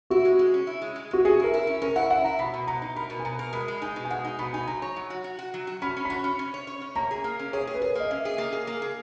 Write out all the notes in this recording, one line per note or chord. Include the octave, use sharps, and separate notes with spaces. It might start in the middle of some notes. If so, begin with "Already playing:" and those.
E4 F#4
G#3
G#3
C#4
E4
G#3
G#3
G#3 F#4
C#4 G#4
E4 A#4
E4
C#4
C#4 A#4
E4 F#5
E4 F#5
E4 A#5
B2 B5
B2
B2 A#5
D#4
A#4 B5
B2
G#5
B2 A#5
A#4
G#3 B5
G#3
D#4 G#5
B2
G#5
G#3 F#5
D#4
B2 B5
D#4 G#5
F#3 A#5
C#5
F#3
F#4
F#4
F#4
F#3
F#4
C#4 B5
C#4
F#4 B5
C#4
C#4
C#5
C#5
C#4
A#3 A#5
G#4
A#3
C#4
G#4 C#5
G#4
B4
G#4 A#4
A#3 D#5
C#4 E5
G#4
A#3
G#4
A#3
G#4